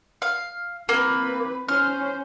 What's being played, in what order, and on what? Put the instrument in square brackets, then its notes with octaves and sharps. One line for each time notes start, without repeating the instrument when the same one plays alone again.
[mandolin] F5
[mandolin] A#3 [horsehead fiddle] C4 B4
[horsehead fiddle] C#4 C5 [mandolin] F6